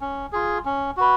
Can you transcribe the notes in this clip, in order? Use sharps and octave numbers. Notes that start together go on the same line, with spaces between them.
C#4
F4 G#4
C#4
F#4 B4